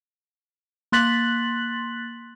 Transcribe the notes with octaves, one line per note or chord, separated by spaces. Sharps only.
A#3 C6 F#6 A6 B6 F#7